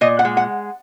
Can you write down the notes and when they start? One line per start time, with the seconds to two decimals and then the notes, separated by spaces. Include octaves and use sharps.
0.01 A#2 D#5
0.19 F#5
0.25 G#3
0.37 F#5